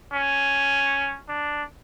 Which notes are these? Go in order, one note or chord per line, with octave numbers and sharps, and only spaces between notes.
C#4
D4